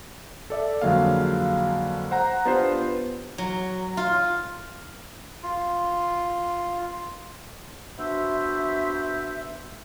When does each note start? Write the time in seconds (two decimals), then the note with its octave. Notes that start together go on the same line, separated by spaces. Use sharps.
0.50 A4 D5 E5
0.82 F2 D3 F#3 G#3 A#3 F5
2.11 C5 F#5 A#5
2.46 B3 D4 F4 G4 C5
3.38 F#3
3.97 F4
5.43 F4
7.99 B3 D4 F#4 C5 E5